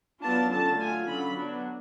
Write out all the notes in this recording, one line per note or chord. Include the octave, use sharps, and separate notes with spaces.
F#3 B3 D4 F4 A5
D3 F#3 C#4 F4 A5
F#3 A3 F4 G#5
D3 F#3 C#4 F4 B5
F#3 B3 D4